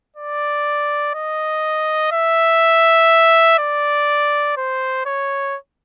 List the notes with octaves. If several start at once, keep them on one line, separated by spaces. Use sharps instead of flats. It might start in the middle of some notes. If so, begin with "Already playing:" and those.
D5
D#5
E5
D5
C5
C#5